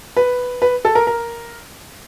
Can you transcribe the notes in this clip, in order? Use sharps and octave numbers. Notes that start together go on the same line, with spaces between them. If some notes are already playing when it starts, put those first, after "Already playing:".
B4
B4
A4
A#4
A#4